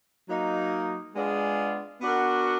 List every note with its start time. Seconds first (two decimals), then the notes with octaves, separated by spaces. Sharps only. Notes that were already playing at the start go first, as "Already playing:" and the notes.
0.29 F#3 A#3 D#4
1.15 G#3 B3 D4 F4 G#4
2.01 B3 D4 F#4 A#4